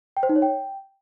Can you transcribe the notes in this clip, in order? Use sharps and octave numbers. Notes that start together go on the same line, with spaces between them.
G5
C5
D#4
C#5
G5